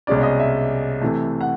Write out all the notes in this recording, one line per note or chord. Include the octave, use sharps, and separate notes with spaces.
C2 B2 G#3 C#4 D5
D#5
E5
C3 E3 A3
F#5